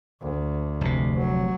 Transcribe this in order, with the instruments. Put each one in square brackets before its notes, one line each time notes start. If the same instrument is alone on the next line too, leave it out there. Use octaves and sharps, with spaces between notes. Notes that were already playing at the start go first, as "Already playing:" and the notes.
[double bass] D2
[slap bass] F1 C3
[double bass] F#3